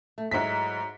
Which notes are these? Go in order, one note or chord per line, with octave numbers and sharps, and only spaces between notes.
A3
G#2 F#3 G#3 E4 B6